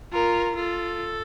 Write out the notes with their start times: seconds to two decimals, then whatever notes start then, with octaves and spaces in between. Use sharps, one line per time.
0.13 F4 A#4
0.56 F4 A4